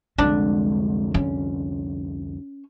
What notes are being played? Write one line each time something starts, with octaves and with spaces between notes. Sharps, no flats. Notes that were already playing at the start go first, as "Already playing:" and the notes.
C2 F2 D3 G#3 D4
C#4